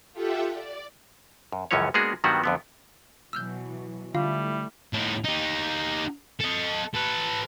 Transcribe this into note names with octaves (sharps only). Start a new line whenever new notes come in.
F4 G4 A4 E5 F#5 G5
D5
F#2
C#2 F#2 E3 F3 C#4 C#5
G#3 A#3 B3 D4 F#4 G#4
G2 D#3 F#3 G3 B3 F#4
F2 D3 B3
B2 E3 F#3 E6 F6 G6
D3 G3 A3 E4 F4 F5
A2 D#4
D#4 G4
A4 D#5
A4 B4